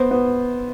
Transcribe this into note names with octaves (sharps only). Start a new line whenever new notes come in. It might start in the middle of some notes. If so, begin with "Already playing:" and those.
Already playing: B3 C5
B3